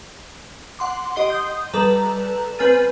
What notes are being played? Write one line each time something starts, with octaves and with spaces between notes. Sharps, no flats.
F#5 C6 D6
G4 D#5 C6 C7 G7
D#6 G6
G3 A4 B4 A#5
C4 B4 G#5 F6 A6 D#7